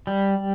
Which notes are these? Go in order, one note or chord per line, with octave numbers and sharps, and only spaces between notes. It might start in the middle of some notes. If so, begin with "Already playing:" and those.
G3